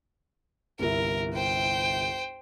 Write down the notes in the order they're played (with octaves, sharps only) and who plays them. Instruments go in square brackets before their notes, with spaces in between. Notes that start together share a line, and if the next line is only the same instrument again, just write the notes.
[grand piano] G1 C2 E4 [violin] A#4
[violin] C5 G5